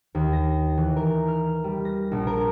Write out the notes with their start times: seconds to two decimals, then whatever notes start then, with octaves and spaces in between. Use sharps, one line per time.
0.15 D#2
0.33 A#6
0.78 E3
0.96 A#4
1.28 F6
1.64 G3
1.85 A#6
2.11 A#1
2.27 A#4